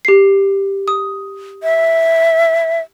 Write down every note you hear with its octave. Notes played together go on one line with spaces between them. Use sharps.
G4 C7
D#6
E5